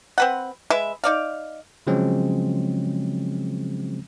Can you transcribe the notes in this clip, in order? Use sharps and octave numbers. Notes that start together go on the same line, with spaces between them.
C4 B4 F#5
G#3 B4 E5
D#4 D5 F5
C#3 F3 F#3 G#3 C4 C#4